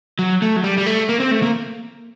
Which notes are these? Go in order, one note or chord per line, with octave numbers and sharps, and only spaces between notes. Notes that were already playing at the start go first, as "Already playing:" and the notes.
F#3
A3
F#3
G3
G3
A3
A#3
C4
A3
A#3